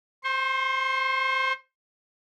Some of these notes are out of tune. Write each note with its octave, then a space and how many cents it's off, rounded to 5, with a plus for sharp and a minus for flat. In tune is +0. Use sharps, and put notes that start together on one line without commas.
C5 +0 C6 +40